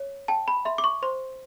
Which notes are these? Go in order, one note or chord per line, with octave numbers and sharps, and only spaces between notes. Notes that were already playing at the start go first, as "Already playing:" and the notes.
Already playing: C#5
G5 A5
B5
E5 C6
D6
C#6
C5 C6